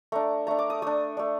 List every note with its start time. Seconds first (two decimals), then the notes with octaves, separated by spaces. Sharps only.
0.12 A3 D4 A#5
0.47 A3 D4 A#5
0.59 D6
0.70 D#6
0.82 A3 D4 D#6
1.17 A3 D4